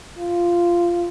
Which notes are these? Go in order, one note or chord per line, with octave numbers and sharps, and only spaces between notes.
F4